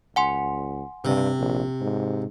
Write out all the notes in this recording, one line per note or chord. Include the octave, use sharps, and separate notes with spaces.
C#2 F#5 G#5 C6
G2 C3
A#1
G#2